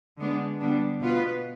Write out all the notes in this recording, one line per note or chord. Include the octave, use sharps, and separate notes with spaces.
D3 G#3 B3 D4
D3 G3 B3 D4
B2 B3 F4 B4